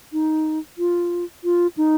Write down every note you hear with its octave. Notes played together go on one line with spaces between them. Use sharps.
D#4
F4
F4
D#4